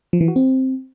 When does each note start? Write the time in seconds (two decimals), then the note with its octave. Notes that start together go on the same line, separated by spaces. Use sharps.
0.13 F3
0.21 E3
0.28 F#4
0.36 C4